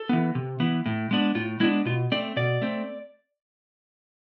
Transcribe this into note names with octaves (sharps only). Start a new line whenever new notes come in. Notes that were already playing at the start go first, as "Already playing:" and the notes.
Already playing: A4
E3 B3
C3
E3 B3
A2
G#3 B3 D4
A2 F4
G#3 B3 D4 E4
B2 F4
A3 C4 D5
B2 D5
A3 C4